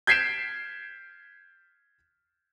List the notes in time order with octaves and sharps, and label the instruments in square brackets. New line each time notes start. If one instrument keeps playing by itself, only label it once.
[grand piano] G6 G#6 B6 C7 D7 E7